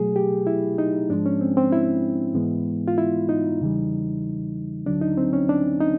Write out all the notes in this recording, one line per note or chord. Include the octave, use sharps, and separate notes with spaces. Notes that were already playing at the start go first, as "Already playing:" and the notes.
Already playing: B2 F#3 A3 G#4
G4
E4
D#4
G#2 F3 G#3 D4
C#4
C4
C4
E4
G#2 E3 G#3 B3
F4
E4
D#4
E2 C#3 E3 G3
D2 D3 F#3 D4
D#4
C4
C#4
D4
D#4